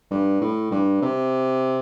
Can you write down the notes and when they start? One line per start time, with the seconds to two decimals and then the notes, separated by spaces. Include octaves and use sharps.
0.11 G2
0.41 A2
0.71 G2
1.02 C3